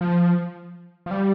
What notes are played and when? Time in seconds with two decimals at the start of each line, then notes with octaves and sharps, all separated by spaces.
0.01 F3
1.06 F3
1.11 G3